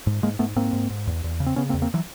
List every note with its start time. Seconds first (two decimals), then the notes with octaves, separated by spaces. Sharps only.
0.07 G#2
0.23 G#2 G#3 A#3
0.39 G#2 A3 B3
0.56 G#2 A#3 C4
0.73 G#2
0.90 G#2
1.07 E2
1.24 E2
1.40 C#3
1.46 C4
1.56 C#3 B3 C#4
1.69 A#3 C4
1.74 E2
1.82 A#3 C4
1.94 E3 F#3